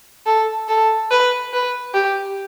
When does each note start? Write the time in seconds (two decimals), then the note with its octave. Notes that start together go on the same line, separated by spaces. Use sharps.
0.26 A4
0.69 A4
1.11 B4
1.53 B4
1.94 G4